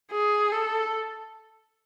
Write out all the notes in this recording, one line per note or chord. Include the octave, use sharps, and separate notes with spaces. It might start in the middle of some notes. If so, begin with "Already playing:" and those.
G#4
A4